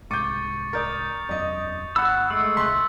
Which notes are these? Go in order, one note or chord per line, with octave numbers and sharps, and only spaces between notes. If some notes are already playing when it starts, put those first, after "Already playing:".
C2 G#2 C#6 D6 G6 A6 C#7
A#4 D5 D#6 G6 A6
E1 F#2 D5 D#5
G1 F#5 B5 E6
G#3 A3 E6
D#1 C2 C6 F#6 B6